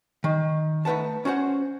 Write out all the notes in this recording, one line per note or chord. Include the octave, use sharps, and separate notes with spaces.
D#3
A3 D#4 B4 F#5 A5
C#4 F#4 C5 F#5